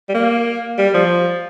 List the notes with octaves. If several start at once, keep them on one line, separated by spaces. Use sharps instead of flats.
G3
A#3
G3
F3